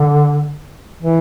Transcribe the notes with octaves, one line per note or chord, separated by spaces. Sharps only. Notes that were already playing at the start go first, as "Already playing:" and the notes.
Already playing: D3
E3